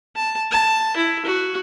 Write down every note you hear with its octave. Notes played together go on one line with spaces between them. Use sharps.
A5
A5
E4
F#4